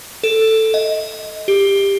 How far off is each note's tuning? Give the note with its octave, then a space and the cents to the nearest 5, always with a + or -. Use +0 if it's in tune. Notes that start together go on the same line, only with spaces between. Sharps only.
A4 +5
D#5 +15
G4 +15